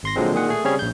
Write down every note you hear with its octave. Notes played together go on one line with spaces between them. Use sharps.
G#1 C6 A#6
A#2 D3 F3 F#3 G#3 C4
A#2 D#3 G#4 F#5
A3 G#4
C#3 G3 C4 C#4 G#4 C#5
A#1 G6